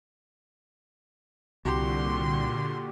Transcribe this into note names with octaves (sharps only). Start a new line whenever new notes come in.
C2 A#2 D3 F#4 G4 C6